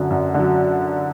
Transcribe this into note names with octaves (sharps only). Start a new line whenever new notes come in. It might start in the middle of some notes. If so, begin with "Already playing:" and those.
Already playing: F#2 D3 F#3
F#2
D3 F#3